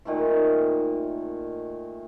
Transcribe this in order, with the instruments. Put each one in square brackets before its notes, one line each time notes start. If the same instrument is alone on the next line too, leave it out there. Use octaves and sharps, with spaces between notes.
[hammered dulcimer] A#2 D#3 A3 E5